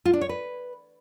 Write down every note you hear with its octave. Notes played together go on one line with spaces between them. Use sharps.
F4
D4
C#5
B4